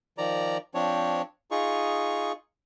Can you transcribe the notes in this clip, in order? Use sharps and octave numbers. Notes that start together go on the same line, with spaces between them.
D#3 F3 D5 A#5
F3 C4 D4 C#5
D#4 F4 G#4 C#6